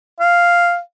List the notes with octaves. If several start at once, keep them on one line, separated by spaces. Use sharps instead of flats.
F5